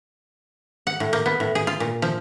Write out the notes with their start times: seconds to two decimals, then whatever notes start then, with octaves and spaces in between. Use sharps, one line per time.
0.87 F#5
1.00 A2
1.13 A#3
1.26 B3
1.40 A2
1.55 G#4
1.67 F4
1.80 A#2
2.02 F3